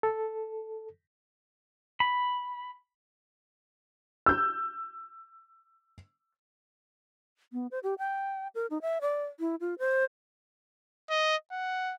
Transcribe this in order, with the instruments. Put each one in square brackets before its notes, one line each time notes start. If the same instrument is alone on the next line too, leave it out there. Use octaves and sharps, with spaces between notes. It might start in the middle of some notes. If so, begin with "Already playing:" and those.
[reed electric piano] A4
[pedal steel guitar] B5
[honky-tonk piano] E6 G6
[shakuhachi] B3
C5
G4
G5
A#4
D#4
E5
D5
E4
F4
C5
[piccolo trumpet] D#5
F#5